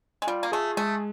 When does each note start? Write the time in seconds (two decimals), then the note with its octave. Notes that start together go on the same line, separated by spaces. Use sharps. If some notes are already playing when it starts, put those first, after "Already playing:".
0.22 G#3
0.27 G3 F4
0.43 A#3
0.52 A3 G#4
0.77 G#3 A3